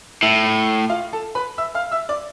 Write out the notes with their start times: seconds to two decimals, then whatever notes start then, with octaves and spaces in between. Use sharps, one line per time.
0.22 A2 E4 E5
0.90 F4 F5
1.13 A4 A5
1.35 B4 B5
1.58 E5 E6
1.75 F5 F6
1.91 E5 E6
2.09 D5 D6